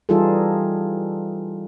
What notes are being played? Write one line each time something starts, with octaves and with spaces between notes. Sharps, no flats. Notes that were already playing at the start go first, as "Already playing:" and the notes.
E3 G3 D#4 F4 G#4 A4